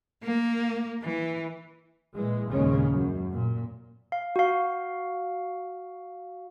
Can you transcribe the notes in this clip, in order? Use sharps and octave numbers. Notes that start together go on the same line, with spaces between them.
A#3
E3
A#2 E3 G#3
D#2 A#2 C#3 G#3 C#4
F#2
A#2
F5
F#4 F5